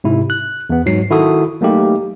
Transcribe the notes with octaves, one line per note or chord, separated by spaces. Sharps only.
G#2 C3 E4
F#6
E2 B3
G#2 F#3 C7
D#3 E4 F#4 A4 D#6
F#3 A3 A#3 D#4 G4